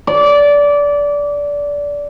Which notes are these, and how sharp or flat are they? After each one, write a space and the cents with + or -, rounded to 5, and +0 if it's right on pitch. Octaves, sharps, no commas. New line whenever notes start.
D5 -20